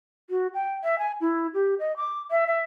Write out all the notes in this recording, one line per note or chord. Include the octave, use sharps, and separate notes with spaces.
F#4
G5
E5
G#5
E4
G4
D#5
D6
E5
E5